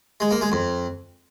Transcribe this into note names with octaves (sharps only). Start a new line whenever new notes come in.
G#3
A#3
G#3
F2